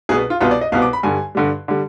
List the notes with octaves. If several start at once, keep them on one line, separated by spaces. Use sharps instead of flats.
C2 B2 B3 G#4
F4
C2 B2 B3 F4
D5
D#5
C2 B2 B3 F5
D6
B5
G2 D3 G3 G#5
G2 D3 G3
D3 G3